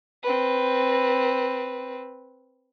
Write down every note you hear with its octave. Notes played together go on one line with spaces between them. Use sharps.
C4 B4